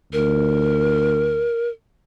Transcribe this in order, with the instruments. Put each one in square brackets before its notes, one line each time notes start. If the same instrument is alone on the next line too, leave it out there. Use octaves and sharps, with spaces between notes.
[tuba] D2 [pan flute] A#4